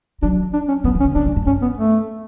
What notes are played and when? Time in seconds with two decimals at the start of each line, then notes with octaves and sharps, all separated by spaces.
0.23 F#3 D4
0.54 D4
0.68 C#4
0.84 F#3 B3
0.95 D3
1.00 C#4
1.05 C#3
1.15 D3 D4
1.26 E3
1.36 A2
1.46 G2 C#4
1.62 B3
1.78 A3